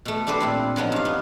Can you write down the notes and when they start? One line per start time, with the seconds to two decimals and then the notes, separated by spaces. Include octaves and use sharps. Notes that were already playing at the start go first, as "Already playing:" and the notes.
0.05 B2 A3
0.27 D4 G4 A4 B4 C5
0.40 A#2 C4 E4
0.76 F3 F#3 B3 D#4
0.92 G2 F5
1.05 B3